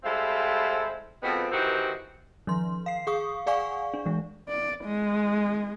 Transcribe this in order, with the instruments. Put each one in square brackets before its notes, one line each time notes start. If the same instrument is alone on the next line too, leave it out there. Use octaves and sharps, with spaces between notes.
[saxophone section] G3 G#3 C4 E4 A4 F5
F2 B2 G#3 B3 C4
D#3 E3 C4 F#4 G4 A#4
[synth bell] D#3 F3 C6
F5 C7
G#4 F5 C#6 D#6
G#4 D5 F5 F#5 G#5 C#6
D4
E3 G#3
[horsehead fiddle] D5
G#3